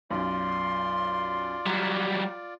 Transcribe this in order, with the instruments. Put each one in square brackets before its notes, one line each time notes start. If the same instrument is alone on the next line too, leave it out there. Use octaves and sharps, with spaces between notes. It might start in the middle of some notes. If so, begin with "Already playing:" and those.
[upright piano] B1 F#2 [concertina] F4 D5 [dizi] C6
[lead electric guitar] F#3 G3 [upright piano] A#5